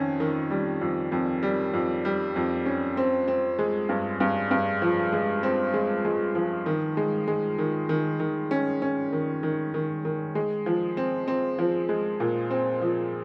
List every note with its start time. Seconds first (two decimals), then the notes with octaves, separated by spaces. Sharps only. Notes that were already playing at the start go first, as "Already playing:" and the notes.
Already playing: F2 D#3 C#4
0.20 D#3
0.51 G3
0.81 F2
1.12 F2
1.43 G3
1.73 F2
2.05 G3
2.36 F2
2.66 C#4
2.97 C4
3.28 C4
3.59 G#3
3.89 G2
4.20 G2
4.51 G2
4.82 F3
5.12 G#3
5.43 C4
5.74 G#3
6.05 G#3
6.35 F3
6.66 D#3
6.97 G#3
7.28 G#3
7.58 D#3
7.89 D#3
8.20 D#3
8.51 C#4
8.82 C#4
9.12 D#3
9.43 D#3
9.74 D#3
10.05 D#3
10.35 G#3
10.66 F3
10.97 C4
11.28 C4
11.59 F3
11.89 G#3
12.20 A#2
12.51 C4
12.82 F3